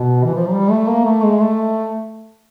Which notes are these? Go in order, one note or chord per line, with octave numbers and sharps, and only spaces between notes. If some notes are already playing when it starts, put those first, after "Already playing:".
Already playing: B2
E3
F3
F#3
G3
A3
A#3
A3
G#3
A3